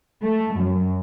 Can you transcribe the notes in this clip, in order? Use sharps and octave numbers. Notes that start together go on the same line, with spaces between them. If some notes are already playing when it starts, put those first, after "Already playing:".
A3
F#2